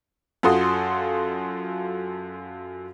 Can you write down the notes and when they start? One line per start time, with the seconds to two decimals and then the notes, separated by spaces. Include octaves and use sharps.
0.43 F#2 F4 F#4 A4 C6 D#6